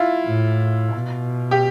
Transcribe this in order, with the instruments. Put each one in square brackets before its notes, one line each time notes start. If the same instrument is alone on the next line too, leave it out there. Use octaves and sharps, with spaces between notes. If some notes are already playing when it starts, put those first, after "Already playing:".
Already playing: [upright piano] E4 F4
[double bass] A2
B2
[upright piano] G4